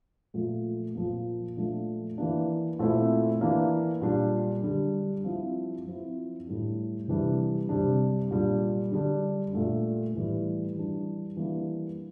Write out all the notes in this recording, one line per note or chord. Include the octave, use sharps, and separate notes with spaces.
A#2 F3 A3
A#2 F3 A#3
A#2 F3 A3 D4
E3 A#3 D4
A#2 A3 C4 E4
E3 A#3 D4
A#2 G3 D4
D3 G3 D4
F3 C4 E4
F3 C4 E4
A2 G3 D4
C3 E3 G3 D4
C3 G3 D4
A#2 G3 D4
D3 G3 D4
A#2 A3 D4
A2 E3 G3
E3 G3 D4
E3 G3 A#3 D4